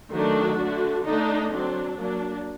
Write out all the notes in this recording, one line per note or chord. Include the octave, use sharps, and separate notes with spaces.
D#3 F#3 A3 D4 F#4
D3 A3 D4
D3 A3 D4 D#4
F#3 C4 D4
F#3 A#3 D4